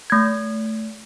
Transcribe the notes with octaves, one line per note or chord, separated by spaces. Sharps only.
A3 G#6